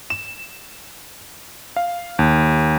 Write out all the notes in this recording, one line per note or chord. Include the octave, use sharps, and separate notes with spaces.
E7
F5
D#2